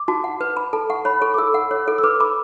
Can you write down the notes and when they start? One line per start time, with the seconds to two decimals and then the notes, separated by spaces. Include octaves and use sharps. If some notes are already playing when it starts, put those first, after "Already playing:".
Already playing: D6
0.08 F#4 A5
0.24 F#5
0.41 B4
0.57 B5
0.73 A4 A5
0.90 F#5 C#6
1.05 C#5 B5
1.22 A4 C#6
1.34 D6
1.38 A4 E6
1.54 F#5
1.71 C#5
1.88 A4
1.98 E6
2.04 B4 D6
2.20 B5 D6